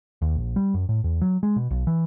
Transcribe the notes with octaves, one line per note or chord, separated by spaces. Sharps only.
D#2
A#1
G3
F#2
A2
E2
F#3
G#3
B2
B1
E3